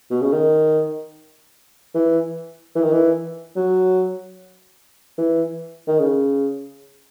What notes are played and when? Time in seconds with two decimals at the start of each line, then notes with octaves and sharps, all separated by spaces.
0.11 B2
0.21 C#3
0.32 D#3
1.94 E3
2.75 E3
2.83 D#3
2.93 E3
3.56 F#3
5.18 E3
5.87 D#3
5.99 C#3